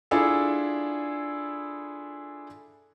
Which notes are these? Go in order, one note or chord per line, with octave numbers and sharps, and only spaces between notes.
D4 E4 F4 G#4 A4